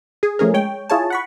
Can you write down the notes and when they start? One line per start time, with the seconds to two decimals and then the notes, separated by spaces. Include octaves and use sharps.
0.23 G#4
0.39 F3 A3 C#4 G#4 A#4
0.53 G#3 C#5 G5
0.90 E4 F4 G#4 C#5 G#5 A5
1.10 F#5 B5 C#6